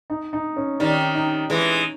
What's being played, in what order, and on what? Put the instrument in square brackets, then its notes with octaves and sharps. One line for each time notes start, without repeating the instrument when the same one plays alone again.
[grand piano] D#4
D#4
C#4
[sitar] D#3 G3 [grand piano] D#4
[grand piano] D#4
[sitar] E3 G#3